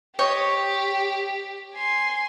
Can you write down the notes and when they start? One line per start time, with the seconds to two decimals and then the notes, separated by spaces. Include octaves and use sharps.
0.19 G4 C#5 D#5 G5
1.76 G#5 C6